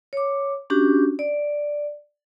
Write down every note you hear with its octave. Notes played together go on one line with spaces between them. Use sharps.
C#5 D6
C#4 D4 F#4 G4
D5